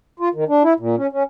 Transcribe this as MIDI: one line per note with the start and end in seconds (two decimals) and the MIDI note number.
0.20 0.29 65
0.35 0.44 51
0.48 0.63 62
0.64 0.73 64
0.80 0.96 46
0.97 1.07 61
1.12 1.23 61